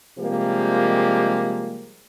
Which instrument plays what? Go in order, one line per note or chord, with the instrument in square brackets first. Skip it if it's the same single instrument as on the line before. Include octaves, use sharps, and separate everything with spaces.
[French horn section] C3 F3 G3 G#3 A#3 G4